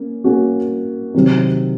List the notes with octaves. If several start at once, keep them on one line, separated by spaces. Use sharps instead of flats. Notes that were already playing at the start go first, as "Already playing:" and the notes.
Already playing: A#3 C#4
A#3 C#4 F#4
C3 D#3 F#3 C4